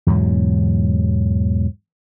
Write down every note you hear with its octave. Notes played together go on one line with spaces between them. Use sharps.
E2 G#2 B2 F#3